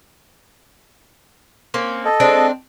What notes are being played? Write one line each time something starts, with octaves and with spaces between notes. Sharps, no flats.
A#3 C4 C#4
A4 D#5
G#3 C4 D4